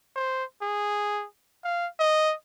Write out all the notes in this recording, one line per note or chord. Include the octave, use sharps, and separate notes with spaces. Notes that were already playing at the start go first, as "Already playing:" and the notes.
C5
G#4
F5
D#5